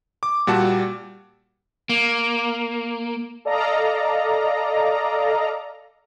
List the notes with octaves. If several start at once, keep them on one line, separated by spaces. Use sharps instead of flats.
D6
A#2 G3 F#4 A5
A#3
A4 D5 D#5 F5 A#5